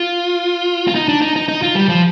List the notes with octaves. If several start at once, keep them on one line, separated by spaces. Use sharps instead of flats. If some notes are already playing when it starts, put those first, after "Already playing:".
Already playing: F4
F4
D#4
D4
D#4
D#4
D#4
F4
G3
F3